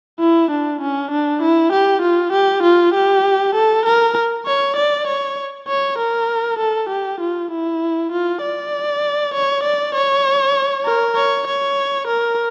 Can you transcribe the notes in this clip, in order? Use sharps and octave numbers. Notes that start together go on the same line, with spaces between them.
E4
D4
C#4
D4
E4
G4
F4
G4
F4
G4
A4
A#4
C#5
D5
C#5
C#5
A#4
A4
G4
F4
E4
F4
D5
C#5
D5
C#5
A#4
C#5
C#5
A#4